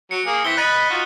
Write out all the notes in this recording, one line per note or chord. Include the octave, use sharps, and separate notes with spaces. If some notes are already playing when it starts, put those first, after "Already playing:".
F#3 C#7
A#3 G#4
E3 C4 E4 B6 G7
D#5 B5 F#6 A6 D#7
D#4 F4 F#4